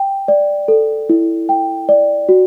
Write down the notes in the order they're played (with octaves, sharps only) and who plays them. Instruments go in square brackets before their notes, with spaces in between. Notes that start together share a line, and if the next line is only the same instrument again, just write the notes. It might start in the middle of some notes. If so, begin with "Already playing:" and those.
Already playing: [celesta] G5
D5
A4
E4
G5
D5
F#4